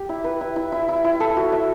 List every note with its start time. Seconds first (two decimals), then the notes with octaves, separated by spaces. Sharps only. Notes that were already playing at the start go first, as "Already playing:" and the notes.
Already playing: G4
0.09 E4
0.24 B4
0.41 E4
0.56 E4
0.72 E4
0.88 E4
1.04 E4
1.20 A4
1.36 F#4
1.52 E5